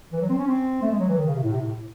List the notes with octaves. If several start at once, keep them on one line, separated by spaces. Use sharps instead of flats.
E3
F#3
C4
C#4
C4
A3
G#3
F#3
E3
D#3
C#3
C3
A2
C3
A2